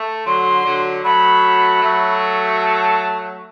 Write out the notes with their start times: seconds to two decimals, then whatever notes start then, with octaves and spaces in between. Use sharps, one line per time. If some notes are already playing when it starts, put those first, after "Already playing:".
Already playing: A3
0.26 D3 F#3 C6
0.65 D3 F#3
1.04 F#3 A3 B5
1.82 F#3 A3
2.61 A5